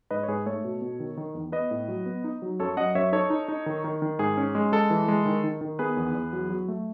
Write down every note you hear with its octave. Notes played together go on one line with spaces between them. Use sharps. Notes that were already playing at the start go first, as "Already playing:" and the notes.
G#2 B4 D#5
C#5
G#2 G#4 B4
A3 A4 C#5
B2
B2
D#3
D#3
E2
B3 B4 D#5
A2
F#3
B3
D#4
F#3
F#2 A4 C#5
F#2 D#5 F#5
F#2 C#5 E5
D#4 A4 C#5
D#4
D#4
D#3
D#3
D#3
G#2 G#4
C#4
G#3
G#3 A4
E3
G#3
D#3
D#3
D#3
B3 G#4 B4
E2
E2
F#3
F#3
A3